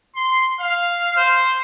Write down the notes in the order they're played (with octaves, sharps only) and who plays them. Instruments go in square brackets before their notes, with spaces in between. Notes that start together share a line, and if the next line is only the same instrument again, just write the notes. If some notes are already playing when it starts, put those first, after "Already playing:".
[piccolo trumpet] C6
F5
C5